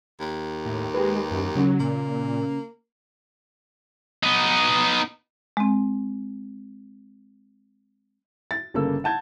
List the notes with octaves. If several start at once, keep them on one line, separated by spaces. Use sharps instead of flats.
D#2
A2
G#3 G4 B4
F#2
C#3 F#3 C#4
A#2 A#3
B3 D#4
G#3 C4
A6
G1 C#3 A#3 A4 E6
F#5 A5 G6 G#6